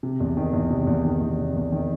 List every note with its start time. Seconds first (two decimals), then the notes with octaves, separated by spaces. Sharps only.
0.03 C3
0.20 E2
0.37 D#3
0.53 E2
0.71 C3
0.87 E2
1.05 D#3
1.21 E2
1.38 C3
1.56 E2
1.72 D#3